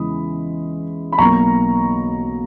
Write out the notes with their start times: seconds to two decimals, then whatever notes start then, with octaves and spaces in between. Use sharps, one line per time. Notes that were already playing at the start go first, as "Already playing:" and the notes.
Already playing: E2 C#3 E3 G#3 B5 D#6
1.12 B5
1.18 B1 B2 A#3 A#5 C#6